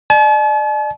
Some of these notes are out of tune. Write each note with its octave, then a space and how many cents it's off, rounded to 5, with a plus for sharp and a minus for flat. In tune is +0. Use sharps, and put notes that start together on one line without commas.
D5 +40 A5 -45